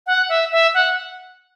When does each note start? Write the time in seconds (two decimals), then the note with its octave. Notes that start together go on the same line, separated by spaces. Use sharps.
0.07 F#5
0.29 E5
0.52 E5
0.74 F#5